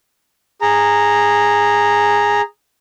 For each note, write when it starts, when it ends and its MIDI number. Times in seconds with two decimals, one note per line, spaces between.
0.62 2.41 68
0.62 2.41 82